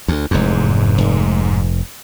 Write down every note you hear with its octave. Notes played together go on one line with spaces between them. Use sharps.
D2
F1 E2 G#2
F1